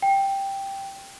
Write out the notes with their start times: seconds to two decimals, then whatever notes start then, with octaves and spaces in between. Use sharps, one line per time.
0.02 G5